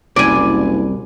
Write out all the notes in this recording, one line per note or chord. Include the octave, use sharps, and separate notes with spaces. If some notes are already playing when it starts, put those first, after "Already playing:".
F#1 C2 D5 G#5